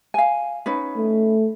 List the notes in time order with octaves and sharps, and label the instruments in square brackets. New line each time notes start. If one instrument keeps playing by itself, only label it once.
[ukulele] F5 G#5
C#4 D#4 B4
[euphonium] A3